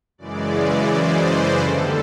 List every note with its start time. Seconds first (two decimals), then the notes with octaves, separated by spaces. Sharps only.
0.18 F#2 C#3 E3 G#3 D5
0.89 C5
1.25 B4
1.59 D#2 D3 G3 A4